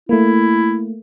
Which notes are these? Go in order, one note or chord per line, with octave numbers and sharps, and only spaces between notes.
A3 A#3 E4